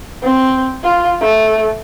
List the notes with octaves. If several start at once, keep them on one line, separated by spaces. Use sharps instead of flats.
C4
F4
A3